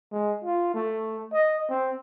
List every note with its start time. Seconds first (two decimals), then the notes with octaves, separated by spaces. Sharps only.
0.11 G#3
0.45 F4
0.75 A3
1.33 D#5
1.70 C4